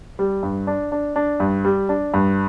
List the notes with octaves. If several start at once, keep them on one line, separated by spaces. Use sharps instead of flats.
G3
G2
D4
D4
D4
G2
G3
D4
G2